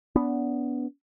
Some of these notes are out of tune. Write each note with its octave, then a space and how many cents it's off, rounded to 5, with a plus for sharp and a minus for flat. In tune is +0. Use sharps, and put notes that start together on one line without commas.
B3 +0 D4 -30